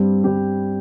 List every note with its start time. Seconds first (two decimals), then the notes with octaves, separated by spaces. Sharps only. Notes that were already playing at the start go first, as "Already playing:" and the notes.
Already playing: G2 G3 C4 G4
0.24 G2 G3 C4 G4